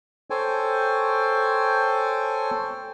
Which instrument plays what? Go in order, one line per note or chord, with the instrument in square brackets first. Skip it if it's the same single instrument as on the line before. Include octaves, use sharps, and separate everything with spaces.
[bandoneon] A4 C5 C#5 G5 G#5